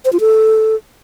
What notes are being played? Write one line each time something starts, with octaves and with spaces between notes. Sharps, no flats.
C5
F4
A4